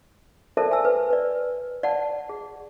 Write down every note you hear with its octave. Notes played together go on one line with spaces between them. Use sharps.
A4 A#4 C5 D5 E5 A5
G#5 E6
B4
B4 D5
D5 F#5 A5
G#4